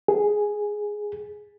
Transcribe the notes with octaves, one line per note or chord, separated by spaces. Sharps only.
G#4